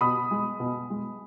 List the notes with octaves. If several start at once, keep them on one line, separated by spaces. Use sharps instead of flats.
B2 B5 D#6
G#3
B2
G#3